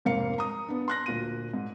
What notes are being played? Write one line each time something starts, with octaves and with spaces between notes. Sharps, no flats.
F1 G#2 A#3 F5 C#7
A#5 D#6
B3 D4
C6 F#6 A#6
D2 A#2 D#7
G#2